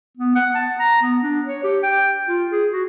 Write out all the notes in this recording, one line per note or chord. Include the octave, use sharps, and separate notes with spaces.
B3
F#5
A5
A#5
B3
D4
C#5
G4
G5
F4
G#4
F#4